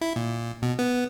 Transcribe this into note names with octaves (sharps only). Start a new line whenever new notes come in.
E4
A#2
B2
B3